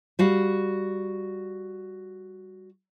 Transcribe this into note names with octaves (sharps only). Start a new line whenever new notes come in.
G3 F#4 F5